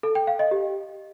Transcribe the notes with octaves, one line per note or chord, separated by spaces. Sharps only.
A4
G5
F5
D#5
G4